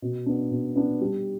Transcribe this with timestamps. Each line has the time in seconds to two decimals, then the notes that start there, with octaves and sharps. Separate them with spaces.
0.02 B2
0.26 B3 D4
0.51 B2
0.76 B3 D4
1.01 G3